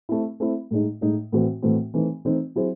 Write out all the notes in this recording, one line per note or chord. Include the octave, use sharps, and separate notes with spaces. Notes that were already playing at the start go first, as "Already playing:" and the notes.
A3 C4 E4
A3 C4 E4
A2 G#3 D#4
A2 G#3 D#4
A2 E3 A3 C4 F#4
A2 E3 A3 C4 F#4
E3 A3 C4 D#4
E3 A3 C4 D#4
F#3 C4 E4 G#4 C5